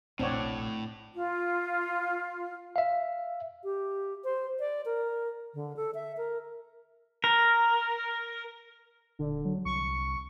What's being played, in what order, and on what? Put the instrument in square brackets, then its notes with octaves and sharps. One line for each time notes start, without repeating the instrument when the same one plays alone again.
[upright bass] F1 A#1 [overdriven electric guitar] A2 [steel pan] C4 C#5 [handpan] D4 D5 F#5
[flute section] F4
[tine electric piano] E5 F5
[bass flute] G4
C5
D5
A#4
D3
A4
E5
A#4
[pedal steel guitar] A#4
[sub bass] D#1 [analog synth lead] D3
[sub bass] F#3
[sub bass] C2 [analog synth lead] C#6